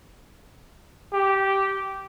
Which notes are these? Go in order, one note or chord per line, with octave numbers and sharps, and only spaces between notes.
G4